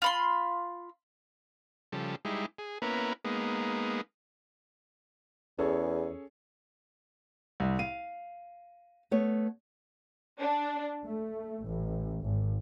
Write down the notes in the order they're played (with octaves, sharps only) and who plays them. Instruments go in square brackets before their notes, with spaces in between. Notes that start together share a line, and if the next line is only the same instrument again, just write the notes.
[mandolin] F4 B5 C6
[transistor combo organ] C#3 F3 G3 A4
G3 G#3 D#4 E4
G#4
A#3 B3 C#4 E4 A#4 B4
G#3 A#3 B3 D#4
[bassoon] E2 [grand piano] C#4 G#4 A4
[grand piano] C2
[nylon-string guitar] F5 [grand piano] D#7
[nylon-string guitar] A3 B3 C#5
[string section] D4
A3
A1
G#1